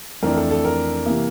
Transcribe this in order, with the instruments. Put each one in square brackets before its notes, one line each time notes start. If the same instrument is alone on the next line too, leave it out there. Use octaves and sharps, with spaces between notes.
[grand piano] F2 E3 A3 D4 A#4
A4
A4
A#4
C3 E3 A#3